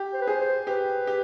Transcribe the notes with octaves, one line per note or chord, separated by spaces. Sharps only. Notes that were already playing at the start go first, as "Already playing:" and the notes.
Already playing: G4
C5
B4
G#4 C5
C5
G4 B4
G4